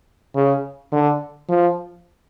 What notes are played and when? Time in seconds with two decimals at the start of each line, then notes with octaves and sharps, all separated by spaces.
0.36 C#3
0.92 D3
1.49 F3